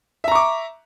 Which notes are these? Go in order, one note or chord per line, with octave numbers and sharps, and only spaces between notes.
E5 A#5 C#6 D6